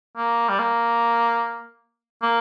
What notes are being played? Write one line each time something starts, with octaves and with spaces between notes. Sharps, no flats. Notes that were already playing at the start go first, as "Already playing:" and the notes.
A#3
G3
A#3
A#3